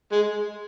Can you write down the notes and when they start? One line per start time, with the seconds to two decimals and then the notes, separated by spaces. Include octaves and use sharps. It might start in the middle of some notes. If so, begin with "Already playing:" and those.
0.12 G#3